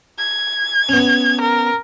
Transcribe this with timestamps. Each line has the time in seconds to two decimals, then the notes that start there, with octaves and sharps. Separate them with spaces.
0.18 G#6
0.89 B3 C#4
1.41 A#4